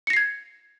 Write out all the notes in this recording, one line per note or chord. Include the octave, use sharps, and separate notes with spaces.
G#6 A#6 C7 C#7